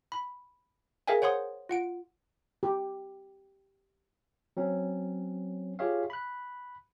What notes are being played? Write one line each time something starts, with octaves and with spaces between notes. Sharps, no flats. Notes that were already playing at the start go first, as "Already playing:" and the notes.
B5
G#4 A#4 E5 F5 G5 G#5
C5 C#5 F#5 C6 D#6
F4 F#5 D7
G4
F#3 C4 C#4
F4 G4 G#4 C#5 E5 F5
B5 F#6